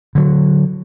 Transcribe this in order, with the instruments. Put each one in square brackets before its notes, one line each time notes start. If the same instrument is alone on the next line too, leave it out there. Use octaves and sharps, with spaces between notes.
[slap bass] D3 F#3